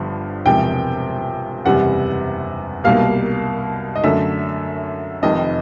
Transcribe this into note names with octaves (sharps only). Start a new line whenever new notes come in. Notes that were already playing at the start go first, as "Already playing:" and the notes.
Already playing: G1 G2 D3 F3
E1 E2 C3 F3 G5
F#1 E2 C3 E3 G3 F#5
C2 B2 G3 A#3 F5
D#5
F#2 D3 F#3 A3 E5
F1 F2 C3 D#3 D#5